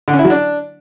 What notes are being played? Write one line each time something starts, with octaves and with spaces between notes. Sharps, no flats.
D3
C#4
E4
F#3
D4